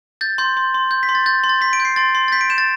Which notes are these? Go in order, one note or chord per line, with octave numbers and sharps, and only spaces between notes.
G6 A6
C6 G6
C6
C6
G6
B6
C6
A6
G6 A6
C6
A6
C6 B6
D7
G6
C7
C6 A6
C6
A6
G6 B6
D7
G6 E7
A6